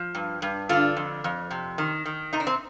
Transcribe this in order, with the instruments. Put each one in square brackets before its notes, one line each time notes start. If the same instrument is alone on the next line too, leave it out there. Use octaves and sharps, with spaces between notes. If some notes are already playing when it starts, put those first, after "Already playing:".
Already playing: [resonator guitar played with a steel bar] F3
G2
G2
D3 D4 F4
F2
F2
C3
D#3
D#3
C3 D#4
D4
C4